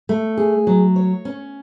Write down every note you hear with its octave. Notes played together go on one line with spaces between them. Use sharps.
A3
G#4
F#3
C#5
C#4